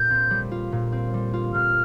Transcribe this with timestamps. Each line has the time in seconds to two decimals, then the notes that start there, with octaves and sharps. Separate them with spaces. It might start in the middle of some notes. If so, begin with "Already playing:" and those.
Already playing: A#2 G6
0.10 C4
0.30 G3
0.51 F4
0.72 A#2
0.92 C4
1.14 G3
1.33 F4
1.54 A#2 F6